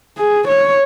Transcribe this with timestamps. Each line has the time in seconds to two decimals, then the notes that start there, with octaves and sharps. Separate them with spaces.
0.18 G#4
0.48 C#5